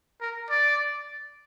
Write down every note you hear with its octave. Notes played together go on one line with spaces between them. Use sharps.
A#4
D5